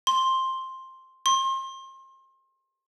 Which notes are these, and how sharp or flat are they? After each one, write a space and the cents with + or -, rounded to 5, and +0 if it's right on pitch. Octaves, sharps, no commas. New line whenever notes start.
C6 +5
C6 +35